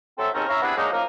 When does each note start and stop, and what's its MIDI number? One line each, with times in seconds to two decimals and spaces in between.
0.18 0.28 54
0.18 0.28 60
0.18 0.28 69
0.18 0.28 72
0.18 0.28 76
0.34 0.44 39
0.34 0.44 44
0.34 0.44 60
0.34 0.44 61
0.34 0.44 69
0.34 0.44 70
0.49 0.60 61
0.49 0.60 64
0.49 0.60 73
0.49 0.60 76
0.49 0.60 77
0.49 0.60 82
0.62 0.74 48
0.62 0.74 59
0.62 0.74 62
0.62 0.74 64
0.62 0.74 68
0.62 0.74 71
0.77 0.89 54
0.77 0.89 56
0.77 0.89 58
0.77 0.89 62
0.77 0.89 63
0.93 1.03 42
0.93 1.03 53
0.93 1.03 58
0.93 1.03 63
0.93 1.03 70